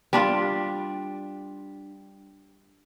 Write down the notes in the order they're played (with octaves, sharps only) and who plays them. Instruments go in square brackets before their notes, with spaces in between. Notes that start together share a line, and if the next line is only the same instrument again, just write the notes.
[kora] G3 D4 F4